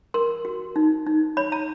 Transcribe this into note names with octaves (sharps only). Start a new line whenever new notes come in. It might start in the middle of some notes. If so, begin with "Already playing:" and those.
A#4 C6
F#4
D#4
D#4
C#5 B5
A#5